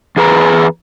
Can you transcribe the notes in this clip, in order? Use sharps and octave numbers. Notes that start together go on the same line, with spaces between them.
E2 G#4 B4 A#5